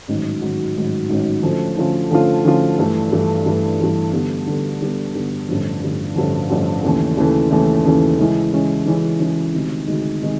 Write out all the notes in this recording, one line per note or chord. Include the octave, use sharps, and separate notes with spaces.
A1 G#2 D#3 F#3
A1 G#2 D#3 F#3
A1 G#2 D#3 F#3
A1 G#2 D#3 F#3
D3 F3 A3 C#4 F4
D3 F3 A3 C#4 F4
D3 F3 A3 C#4 F4
D3 F3 A3 C#4 F4
G2 E3 A3
G2 E3 A3
G2 E3 A3
G2 E3 A3
D3 G3 B3
D3 G3 B3
D3 G3 B3
D3 G3 B3
A1 G2 D3 F3
A1 G2 D3 F3
A1 G2 D3 F3
A1 G2 D3 F3
D#2 C#3 E3 A3
D#2 C#3 E3 A3
D#2 C#3 E3 A3
D#2 C#3 E3 A3
C#3 E3 G#3 C#4 E4
C#3 E3 G#3 C#4 E4
C#3 E3 G#3 C#4 E4
C#3 E3 G#3 C#4 E4
D2 C3 D#3 G#3
D2 C3 D#3 G#3
C3 D#3 G#3